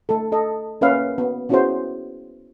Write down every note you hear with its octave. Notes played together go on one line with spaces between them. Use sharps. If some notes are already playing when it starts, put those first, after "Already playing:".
A3 A4
A4 D#5
A#3 C#4 B4 E5 F5
B3
B3 C#4 E4 F#4 G#4 C5